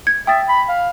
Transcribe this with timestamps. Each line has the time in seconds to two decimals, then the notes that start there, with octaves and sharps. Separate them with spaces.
0.07 G#6
0.27 E5 G5 D#6 A6
0.48 B5
0.69 F5